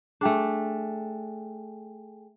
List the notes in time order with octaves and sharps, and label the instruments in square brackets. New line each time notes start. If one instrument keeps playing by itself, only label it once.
[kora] A3 D4 [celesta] G#4 G5 G#5